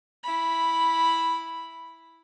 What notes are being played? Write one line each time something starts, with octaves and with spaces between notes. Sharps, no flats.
E4 B5